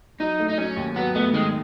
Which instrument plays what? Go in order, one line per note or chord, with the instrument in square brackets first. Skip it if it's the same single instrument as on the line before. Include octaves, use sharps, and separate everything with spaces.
[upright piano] F#3 [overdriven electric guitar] D#4
[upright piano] A3
[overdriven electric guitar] D#4
[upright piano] F#3 [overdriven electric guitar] C#4
[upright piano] D#2
[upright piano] F#3 [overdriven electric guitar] B3
[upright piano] A3 [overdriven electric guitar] B3
[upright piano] D#3 [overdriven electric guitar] G#3